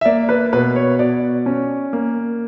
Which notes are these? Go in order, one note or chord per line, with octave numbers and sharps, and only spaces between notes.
E5
A#3 D5
B4
B2 B4
C#5
B2 D5
C#4
A#3